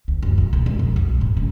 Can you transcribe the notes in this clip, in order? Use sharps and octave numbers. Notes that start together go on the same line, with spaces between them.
D2
F#1
B1
C#2
E1
F2
B1
G#2
C#3